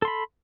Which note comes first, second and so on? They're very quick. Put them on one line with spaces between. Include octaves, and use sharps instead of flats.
A4 C6 B5